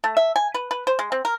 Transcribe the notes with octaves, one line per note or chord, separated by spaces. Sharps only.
A3
E5
G#5
B4
B4
C5
G#3
C4
A#4